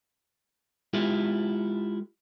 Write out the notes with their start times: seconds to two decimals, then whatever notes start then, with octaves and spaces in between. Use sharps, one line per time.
0.93 G#3 E4 F4 G4 A4